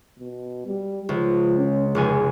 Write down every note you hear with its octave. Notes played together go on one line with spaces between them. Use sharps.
B2
G3
C#2 F3
C#4
F1 C#2 G#4 G#5